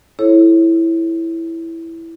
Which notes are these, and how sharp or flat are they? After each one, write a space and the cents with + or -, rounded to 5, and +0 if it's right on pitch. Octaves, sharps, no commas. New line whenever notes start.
E4 +0 A4 -25 C#5 -25